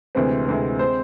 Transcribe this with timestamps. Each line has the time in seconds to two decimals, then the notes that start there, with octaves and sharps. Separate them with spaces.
0.15 D2 C3 E3 G#3 C4 C5
0.47 D2 C3 E3 G#3 C4
0.79 G#3 C4 C5